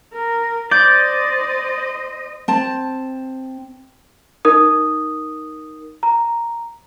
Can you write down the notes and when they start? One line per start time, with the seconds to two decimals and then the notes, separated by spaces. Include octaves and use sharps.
0.13 A#4
0.71 C5 D5 D#5 G6
2.48 C4 A5
4.45 D#4 A#4 D#6
6.03 A#5